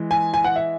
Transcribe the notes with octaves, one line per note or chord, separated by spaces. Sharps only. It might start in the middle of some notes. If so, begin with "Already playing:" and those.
Already playing: E3 G#3
G#5
G#5
F#5
E5